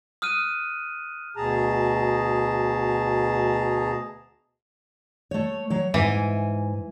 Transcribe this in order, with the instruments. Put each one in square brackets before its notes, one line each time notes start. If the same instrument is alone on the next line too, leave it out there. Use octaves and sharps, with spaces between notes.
[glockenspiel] D#6 F6 F#6 D#7
[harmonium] D2 B2 G#4 A5 A#5
[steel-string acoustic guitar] A3 C#5
F#3 C#5
[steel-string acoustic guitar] G#2 G#5 [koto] E3